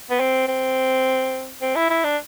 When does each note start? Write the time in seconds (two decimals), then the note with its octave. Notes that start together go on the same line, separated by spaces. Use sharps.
0.10 B3
0.20 C4
0.48 C4
1.62 C4
1.76 E4
1.90 E4
2.05 D4